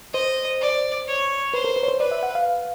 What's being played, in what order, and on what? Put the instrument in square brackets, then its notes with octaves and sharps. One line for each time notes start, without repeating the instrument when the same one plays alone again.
[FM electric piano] C5 [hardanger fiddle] D#5
[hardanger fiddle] D5
C#5
[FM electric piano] B4 [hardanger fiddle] C5
[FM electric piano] A#4
B4
C#5
C5
[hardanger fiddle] B4 [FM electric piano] D5
[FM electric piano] E5
F#5
F5